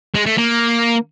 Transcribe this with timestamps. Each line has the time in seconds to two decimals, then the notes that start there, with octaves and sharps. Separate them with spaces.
0.15 G#3
0.26 A3
0.38 A#3